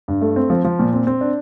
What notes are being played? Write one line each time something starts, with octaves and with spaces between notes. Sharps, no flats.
G2
A3
C4
F3
F3
A#2
C4
C4
D4